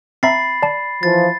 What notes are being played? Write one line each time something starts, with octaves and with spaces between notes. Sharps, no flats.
C4 E5 A#5 B5 A6 C7
D5 A5
E3 F3 A6